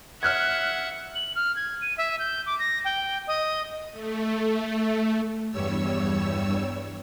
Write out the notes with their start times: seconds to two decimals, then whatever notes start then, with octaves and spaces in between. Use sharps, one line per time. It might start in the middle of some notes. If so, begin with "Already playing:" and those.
0.23 E5 F#5 F6 F#6 G#6
1.15 F#7
1.36 F6
1.56 G#6
1.81 D#7
1.98 E5
2.19 G6
2.46 D6
2.59 A#6
2.85 G5
3.27 D#5
3.90 A3
5.51 E2 G2 G3 C#5 E6